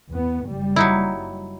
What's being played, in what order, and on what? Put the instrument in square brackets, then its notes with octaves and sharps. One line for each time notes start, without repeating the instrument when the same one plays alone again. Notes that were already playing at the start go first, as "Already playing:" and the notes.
[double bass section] E2 B3
F#1 G3
[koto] F#3 D#4 E4